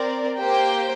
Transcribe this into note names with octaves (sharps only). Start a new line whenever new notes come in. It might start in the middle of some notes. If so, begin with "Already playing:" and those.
Already playing: C4 A#4 D5
A#3 G4 C5 G5